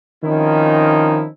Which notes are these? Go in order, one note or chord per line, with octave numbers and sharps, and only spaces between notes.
D#3 F3 C4 C#4 D#4 E4